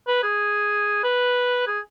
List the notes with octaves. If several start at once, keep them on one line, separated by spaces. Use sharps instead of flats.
B4
G#4
B4
G#4